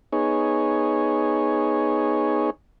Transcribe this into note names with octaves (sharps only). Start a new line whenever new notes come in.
B3 D#4 G#4 C#5